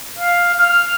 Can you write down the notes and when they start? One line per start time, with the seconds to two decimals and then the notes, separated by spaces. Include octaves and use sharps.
0.19 F5
0.60 F6